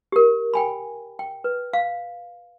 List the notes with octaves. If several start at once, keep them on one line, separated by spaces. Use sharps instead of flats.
G4 A#4
G5 G#5 B5
G5
B4
F5